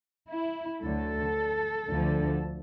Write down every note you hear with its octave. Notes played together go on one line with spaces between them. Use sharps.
E4
D2 D3 F#3 A4
D2 D3 F3